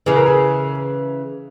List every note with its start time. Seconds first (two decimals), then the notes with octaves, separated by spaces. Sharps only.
0.06 C#3 E3 G#4
0.16 A#4
0.26 G#4